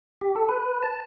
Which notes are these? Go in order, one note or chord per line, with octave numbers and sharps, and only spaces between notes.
G4
A4
B4
A5